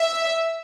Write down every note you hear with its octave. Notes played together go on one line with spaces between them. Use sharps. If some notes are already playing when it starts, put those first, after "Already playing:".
Already playing: E5